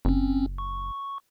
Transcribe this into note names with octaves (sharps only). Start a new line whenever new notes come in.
F#1 C4 C#4
C#6